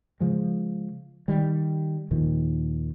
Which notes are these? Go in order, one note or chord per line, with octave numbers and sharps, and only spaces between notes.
C#3 F3 G#3
D#3 G3
D#2 A#2 D#3 F3